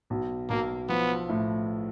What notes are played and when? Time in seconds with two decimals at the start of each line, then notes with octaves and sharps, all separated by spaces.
0.10 B1
0.49 B1 A#3
0.89 F3 B3
1.29 A2